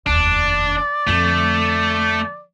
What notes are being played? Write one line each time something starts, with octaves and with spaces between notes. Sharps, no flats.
F1 D#2 D4 D5
F2 D3 A3